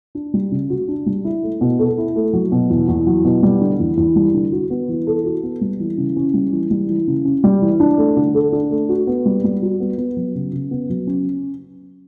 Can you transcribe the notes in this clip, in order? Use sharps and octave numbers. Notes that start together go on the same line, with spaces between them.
D4
G3
C#3
F#4
D4
G3
E4
A3
B2
A4
E4
A3
F#3
B2
E2
E2
F#3
B2
G3
D3
E2
E2
G3
D3
F#4
B3
E3
A4
F#4
B3
G3
E3
C#3
C#4
G3
E3
G3
E3
C#3
C#4
G3
E3
D4
A3
D3
A4
D4
A3
F#4
B3
G3
G3
F#4
B3
B3
F#3
C#3
C#3
B3
F#3
C#4